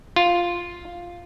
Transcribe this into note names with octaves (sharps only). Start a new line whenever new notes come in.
F4